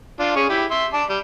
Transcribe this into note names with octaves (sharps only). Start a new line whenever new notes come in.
D4 F4
C#4 G#4 C#6
E4 G4
E5 C6
D5 A5
G3